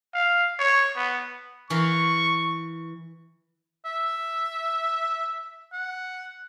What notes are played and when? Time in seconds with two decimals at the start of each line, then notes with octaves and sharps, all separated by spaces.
0.14 F5
0.59 C#5
0.96 B3
1.70 E3 A#4 F5 C#6
3.85 E5
5.73 F#5